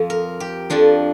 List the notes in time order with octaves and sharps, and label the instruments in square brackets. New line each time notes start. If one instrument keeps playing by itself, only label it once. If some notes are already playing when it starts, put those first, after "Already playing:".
Already playing: [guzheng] F2 F3
A#4
G4
F2 F3 D4